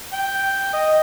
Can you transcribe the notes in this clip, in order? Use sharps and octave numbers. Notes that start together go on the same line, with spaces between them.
G5
D#5